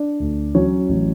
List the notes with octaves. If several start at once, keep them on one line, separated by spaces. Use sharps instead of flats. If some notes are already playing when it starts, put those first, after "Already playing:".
Already playing: D4 D5
D2
F#3 C#4 C#5
A1